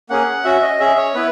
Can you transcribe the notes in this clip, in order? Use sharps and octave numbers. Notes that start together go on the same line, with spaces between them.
A#3 C#4 G#4 F#5
C#4 F#4 E5
D#5
C#4 G#4 E5
C#5
B3 E4 B4